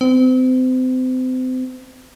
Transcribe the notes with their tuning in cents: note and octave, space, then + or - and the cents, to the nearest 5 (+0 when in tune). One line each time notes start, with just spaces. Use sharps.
C4 -35